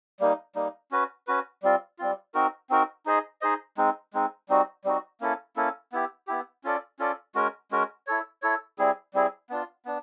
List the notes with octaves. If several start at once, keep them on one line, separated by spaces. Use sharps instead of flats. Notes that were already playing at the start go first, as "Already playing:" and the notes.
G3 A#3 D#4
G3 A#3 D#4
C#4 F#4 B4
C#4 F#4 B4
G3 C4 F4
G3 C4 F4
C4 D#4 F#4 A#4
C4 D#4 F#4 A#4
D#4 G#4 C5 D#5
D#4 G#4 C5 D#5
G#3 C4 D#4
G#3 C4 D#4
G3 C4 D#4 F#4
G3 C4 D#4 F#4
A#3 C#4 E4 A4
A#3 C#4 E4 A4
B3 E4 G4
B3 E4 G4
C#4 F4 A4 D5
C#4 F4 A4 D5
G#3 C#4 F#4 A#4
G#3 C#4 F#4 A#4
E4 A4 C#5
E4 A4 C#5
G3 C4 E4 G#4
G3 C4 E4 G#4
B3 D4 F4
B3 D4